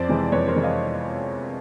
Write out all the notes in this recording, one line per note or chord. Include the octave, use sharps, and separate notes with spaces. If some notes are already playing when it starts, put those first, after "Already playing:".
Already playing: F2 C5 D5
C3 E3 G#3 C4
F2 B4 C#5
A#4 C5
C3 E3 G#3 C4
D#5 F5